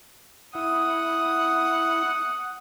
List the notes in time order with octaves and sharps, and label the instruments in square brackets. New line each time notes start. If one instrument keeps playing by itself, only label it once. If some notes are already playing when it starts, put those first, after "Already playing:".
[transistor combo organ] E4 [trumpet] F#5 [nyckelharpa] D#6